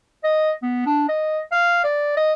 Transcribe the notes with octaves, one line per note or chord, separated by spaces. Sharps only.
D#5
B3
D4
D#5
F5
D5
D#5